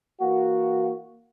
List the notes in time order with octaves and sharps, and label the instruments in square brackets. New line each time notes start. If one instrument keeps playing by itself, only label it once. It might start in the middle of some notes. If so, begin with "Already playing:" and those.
[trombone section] E3 A#3 F#4